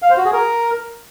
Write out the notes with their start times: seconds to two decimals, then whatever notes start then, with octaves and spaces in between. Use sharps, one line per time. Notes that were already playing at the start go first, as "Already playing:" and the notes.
0.02 F5
0.10 C5
0.18 F#4
0.25 G#4
0.33 A#4